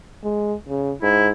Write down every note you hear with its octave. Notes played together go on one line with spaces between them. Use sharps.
G#3
C#3
G#2 E4